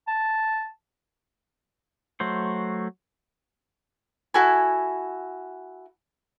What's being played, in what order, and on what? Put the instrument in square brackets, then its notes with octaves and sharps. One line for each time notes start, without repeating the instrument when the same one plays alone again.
[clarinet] A5
[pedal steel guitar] F#3 A3 C5
[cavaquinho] E4 F#4 A4 G#5